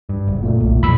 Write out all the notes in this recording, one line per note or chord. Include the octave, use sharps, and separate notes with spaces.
G2
F#1
A#2 A3
B1
B1 F2 A#2 B5 E6